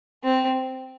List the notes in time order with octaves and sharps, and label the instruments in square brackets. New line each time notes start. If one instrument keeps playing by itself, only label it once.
[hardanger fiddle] C4